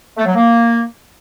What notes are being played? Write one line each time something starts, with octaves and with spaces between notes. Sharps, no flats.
A3
F#3
A#3